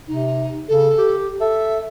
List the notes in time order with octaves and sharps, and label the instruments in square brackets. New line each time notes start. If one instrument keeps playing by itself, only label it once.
[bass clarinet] C3 [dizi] D#4
[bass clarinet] C#3 [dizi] A4
[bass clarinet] G4
[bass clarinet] A4 [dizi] E5